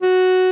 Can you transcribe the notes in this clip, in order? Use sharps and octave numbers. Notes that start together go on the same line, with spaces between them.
F#4